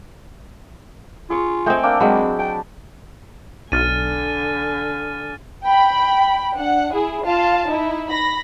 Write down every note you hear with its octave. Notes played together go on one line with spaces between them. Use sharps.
F4 G#4 C#6
A3 C4 D#5 G5 G#5
A#3 D4 G5 E6
F#3 G#3 C4 B5
G5 A5
B1 D3 G#5 F6 A6 D#7
G5 B5
D4 F#5
E4 G#4
F4 F5 A5
D#4 E4
B5 A#6